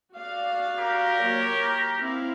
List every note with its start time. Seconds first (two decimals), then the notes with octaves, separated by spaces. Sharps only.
0.14 F#4 D5 F5
0.79 G4 A#4
1.22 F#3 A#3 C#5
1.99 C4 E4 F5